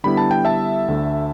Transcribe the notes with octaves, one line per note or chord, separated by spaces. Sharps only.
D3 G3 B3 E4 B5
A5
G5
E5 A5
D2 D3 A3